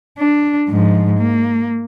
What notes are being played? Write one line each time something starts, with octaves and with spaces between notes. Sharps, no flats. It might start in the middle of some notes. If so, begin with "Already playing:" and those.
D4
G#2 F3
A#3